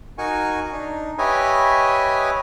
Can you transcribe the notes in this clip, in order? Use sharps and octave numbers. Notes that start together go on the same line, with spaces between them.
D#4 F#4 A#4 G#5 C#6
D4 D#4
G4 B4 C#5 D#5 E5 G#5